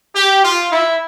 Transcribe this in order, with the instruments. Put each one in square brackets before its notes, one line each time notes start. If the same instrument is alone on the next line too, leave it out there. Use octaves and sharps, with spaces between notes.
[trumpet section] G4
F4
E4